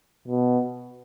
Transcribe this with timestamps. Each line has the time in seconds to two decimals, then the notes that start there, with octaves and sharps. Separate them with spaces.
0.28 B2